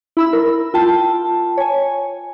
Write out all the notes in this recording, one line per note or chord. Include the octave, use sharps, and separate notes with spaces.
E4 B5 E6
A#4
F4 G5 A5
C#5 G#5